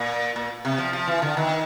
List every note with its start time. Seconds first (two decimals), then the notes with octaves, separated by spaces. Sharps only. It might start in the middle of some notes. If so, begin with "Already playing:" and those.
Already playing: A#2
0.36 A#2
0.65 C3
0.78 F3
0.93 F3
1.07 E3
1.22 D3
1.37 D#3